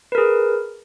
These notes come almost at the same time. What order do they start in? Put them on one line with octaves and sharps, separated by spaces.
B4 A#4 G#4